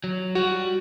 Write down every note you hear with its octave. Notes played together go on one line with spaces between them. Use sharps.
F#3
G3 F#4